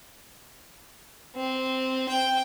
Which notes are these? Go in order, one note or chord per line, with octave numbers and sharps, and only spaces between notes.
C4
G5